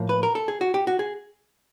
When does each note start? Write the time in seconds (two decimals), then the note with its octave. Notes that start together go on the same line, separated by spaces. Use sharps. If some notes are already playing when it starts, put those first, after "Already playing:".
Already playing: A2 F3 A#3
0.09 B4
0.23 A#4
0.35 A4
0.48 G#4
0.61 F#4
0.74 G4
0.87 F#4
0.99 G#4